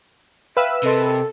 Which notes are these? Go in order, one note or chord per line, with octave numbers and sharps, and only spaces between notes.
B4 E5 F5 G5 E6 F6
C3 A4 A#4 D#5 C6